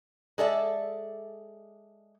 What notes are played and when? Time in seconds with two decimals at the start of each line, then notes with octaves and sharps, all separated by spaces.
0.38 G#3 A4 D5 E5